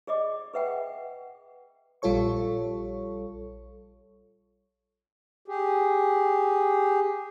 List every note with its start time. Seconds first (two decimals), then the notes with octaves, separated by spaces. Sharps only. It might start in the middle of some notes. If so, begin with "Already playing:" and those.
0.07 G#4 D5 D#5 D6
0.54 G#4 B4 E5 F#5 G5
2.02 A#1 G3 F4 A4 C#5 C#6
5.48 G4 G#4